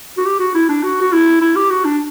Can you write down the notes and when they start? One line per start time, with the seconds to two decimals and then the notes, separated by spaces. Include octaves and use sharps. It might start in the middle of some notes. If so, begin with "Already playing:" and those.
0.18 F#4
0.26 G4
0.40 F#4
0.55 E4
0.69 D4
0.83 F#4
1.01 F#4
1.13 E4
1.41 E4
1.56 G4
1.70 F#4
1.85 D4